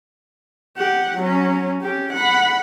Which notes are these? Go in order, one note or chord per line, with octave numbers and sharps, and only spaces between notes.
G4 F#5
F#3 C#4
C#4 G4
F#5 B5